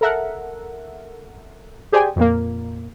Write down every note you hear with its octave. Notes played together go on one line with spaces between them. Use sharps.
A4 A#4 E5 F#5
G4 G#4 C5 D5 G5 G#5
F2 A#2 A#3